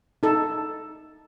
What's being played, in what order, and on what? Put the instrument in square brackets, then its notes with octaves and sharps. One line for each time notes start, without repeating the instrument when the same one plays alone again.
[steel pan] D#4 A4